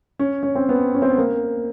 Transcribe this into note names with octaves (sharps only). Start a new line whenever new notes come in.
C#4
C#4
C4
B3
C#4
C4
B3
A#3